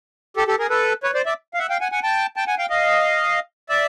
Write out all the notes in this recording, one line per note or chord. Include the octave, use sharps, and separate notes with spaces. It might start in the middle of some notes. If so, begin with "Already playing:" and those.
G4 A4
G4 A4
G#4 A#4
A4 B4
B4 C#5
C5 D5
D5 E5
F5
E5 F#5
F5 G5
F#5 G#5
F#5 G#5
G5 A5
G5 A5
F#5 G#5
F5 G5
D#5 F5
D5 E5